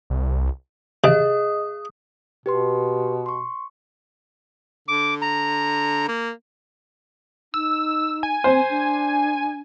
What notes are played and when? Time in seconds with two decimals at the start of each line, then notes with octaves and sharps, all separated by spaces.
0.10 C2
1.04 C3 G#4 D#5 D#6
2.46 B2 G4 B4 C6
3.26 C6 C#6
4.88 D3 D6
5.22 A#5
6.08 A#3
7.54 D#4 E6
8.23 G#5
8.44 C4 C5
8.70 D4